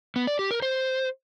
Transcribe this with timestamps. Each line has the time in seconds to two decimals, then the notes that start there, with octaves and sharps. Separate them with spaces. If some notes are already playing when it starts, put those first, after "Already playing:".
0.16 B3
0.27 D5
0.39 G4
0.51 A#4
0.62 C5